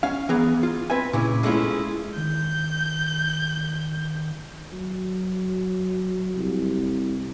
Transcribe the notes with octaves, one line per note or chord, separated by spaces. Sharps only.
C#4 F5
E3 B3 G#4 A#5
F4
C4 B4 E5 G#5
A#2 C#3 E4
G#3 A3 C#4 D4 E4 F4
D#3 G6
F#3
C2